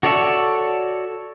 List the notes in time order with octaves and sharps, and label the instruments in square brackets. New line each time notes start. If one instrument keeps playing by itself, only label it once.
[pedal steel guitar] F#4 A4 C#5 D5 E5